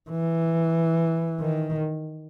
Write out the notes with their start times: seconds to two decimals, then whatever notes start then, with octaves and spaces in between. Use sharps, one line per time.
0.10 E3
1.41 D#3